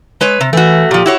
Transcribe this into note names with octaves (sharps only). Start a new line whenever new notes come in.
G#3 B4 C#5
C3
E3 A3 F#4
A#2 F3 G4
E4 F#4 C#5